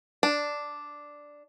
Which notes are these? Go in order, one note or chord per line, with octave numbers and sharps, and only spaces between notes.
D4